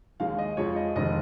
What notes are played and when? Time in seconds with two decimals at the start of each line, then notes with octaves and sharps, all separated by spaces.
0.20 D#2 D#3 G#3 F5
0.38 D#5
0.57 F2 F3 G#3 C#5
0.76 D#5
0.95 F1 F2 D#3 G#3 D#5